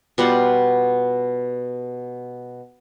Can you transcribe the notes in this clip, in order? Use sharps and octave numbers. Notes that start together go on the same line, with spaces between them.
B2 G3 F4 F#5